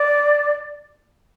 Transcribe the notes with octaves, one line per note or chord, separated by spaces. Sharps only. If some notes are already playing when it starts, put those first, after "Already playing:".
Already playing: D5